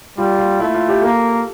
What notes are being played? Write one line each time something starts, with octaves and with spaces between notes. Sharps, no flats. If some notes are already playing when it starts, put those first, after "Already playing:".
G3 F4
F4
A3 E4
F4
G4
A#3 A4